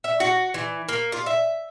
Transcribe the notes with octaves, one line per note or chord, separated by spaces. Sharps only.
E5
F#4
E3
A#3
F4
E5